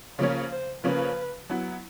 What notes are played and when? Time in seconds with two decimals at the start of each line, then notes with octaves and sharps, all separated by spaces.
0.18 C#3 F3 A#3 C#4 C#5
0.51 C5
0.84 C#3 F3 A#3 C#4 B4
1.49 F#3 B3 E4